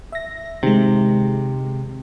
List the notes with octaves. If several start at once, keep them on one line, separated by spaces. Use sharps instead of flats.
E5 A#6
C3 D#3 G#3